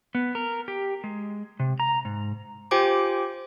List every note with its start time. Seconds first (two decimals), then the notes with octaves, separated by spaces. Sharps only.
0.15 B3
0.35 A#4
0.68 G4
1.04 G#3
1.60 C3
1.80 A#5
2.05 G#2
2.71 F4 G4 C5 G5 G#5 D6